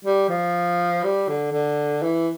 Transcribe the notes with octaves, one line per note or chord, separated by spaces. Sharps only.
G3
F3
G3
D3
D3
E3